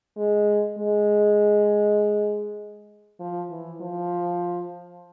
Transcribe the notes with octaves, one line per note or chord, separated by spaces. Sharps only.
G#3
G#3
F3
E3
F3